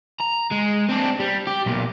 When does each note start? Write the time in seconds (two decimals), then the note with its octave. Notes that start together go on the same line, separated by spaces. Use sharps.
0.20 A#5
0.51 G#3
0.89 C4 D4
1.20 G3
1.47 G4
1.66 B1 A#2